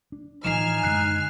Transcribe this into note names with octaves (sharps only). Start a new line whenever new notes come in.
D4
A2 E3 F3 D#4 G#5 F6 C7 E7
F#2 D3 G#3 F#6 C7